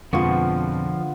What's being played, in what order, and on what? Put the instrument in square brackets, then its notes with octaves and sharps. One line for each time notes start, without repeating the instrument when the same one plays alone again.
[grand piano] F2 B2 [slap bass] D3 G#3 [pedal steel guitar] F3 C#6 [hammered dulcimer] B3 F4